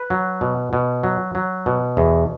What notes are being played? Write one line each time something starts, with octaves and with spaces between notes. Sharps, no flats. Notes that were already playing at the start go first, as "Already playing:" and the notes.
Already playing: B4
F#3
B2
B2
F#3
F#3
B2
E2